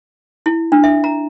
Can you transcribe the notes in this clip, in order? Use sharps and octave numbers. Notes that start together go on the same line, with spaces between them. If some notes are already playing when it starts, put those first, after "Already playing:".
E4
D4
E5
A#5